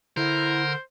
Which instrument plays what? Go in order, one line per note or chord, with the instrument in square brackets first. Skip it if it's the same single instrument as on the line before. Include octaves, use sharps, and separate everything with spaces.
[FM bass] D3 [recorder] E4 [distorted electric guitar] A#4 [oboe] C5